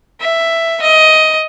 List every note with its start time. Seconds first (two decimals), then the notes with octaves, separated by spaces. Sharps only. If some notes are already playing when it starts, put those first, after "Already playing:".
0.20 E5
0.82 D#5